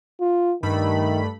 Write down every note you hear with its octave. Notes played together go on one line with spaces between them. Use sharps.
F4
G2 D#3 A3 B5